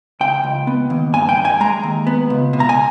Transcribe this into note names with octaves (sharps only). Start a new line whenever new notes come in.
C#2 G5
C#2
B3
D#2
G2 G#5
G5
G2
G#5
G#3 A#5
D#2
B3
C#2
B2
A#5
G#5